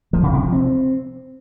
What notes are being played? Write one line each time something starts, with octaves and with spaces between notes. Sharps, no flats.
F3
C#3
C3
F3
C4